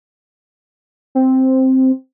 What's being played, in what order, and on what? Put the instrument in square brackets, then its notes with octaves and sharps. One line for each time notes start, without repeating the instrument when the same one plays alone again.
[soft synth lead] C4